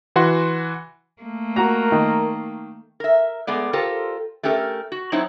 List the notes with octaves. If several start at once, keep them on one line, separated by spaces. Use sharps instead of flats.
E3 F#4 C6
A3 A#3
F#4 A#4 A#5
D#3
A#4 E5
G#3 A3 B3 D5
F4 G4 A4 A#4 C5
A3 C#4 G4 A4 A#4
F#4
F#3 C4 D#4 E4 C5 C#5